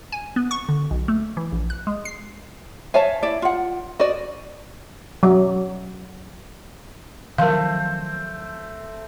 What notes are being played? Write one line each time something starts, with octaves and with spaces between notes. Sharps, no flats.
G#5
B3
C#6
D3
B1
A3
E3
A#1
F#6
G#3
C7
C#5 E5 F5 G#5 A5
E4 D5
F4 F#5
F#4 D5 D#5
F#3
D#3 F3 F#3 A3 C4 A#4 F5